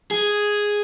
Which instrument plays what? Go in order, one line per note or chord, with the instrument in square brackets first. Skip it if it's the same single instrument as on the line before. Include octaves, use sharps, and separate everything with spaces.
[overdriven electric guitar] G#4